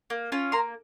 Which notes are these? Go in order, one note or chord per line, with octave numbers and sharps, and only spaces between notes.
A#3
C#4 F4
A#3 A#5 C6